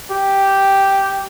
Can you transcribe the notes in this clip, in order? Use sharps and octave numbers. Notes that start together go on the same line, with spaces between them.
G4